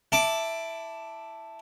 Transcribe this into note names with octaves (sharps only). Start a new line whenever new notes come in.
E4 A5 D6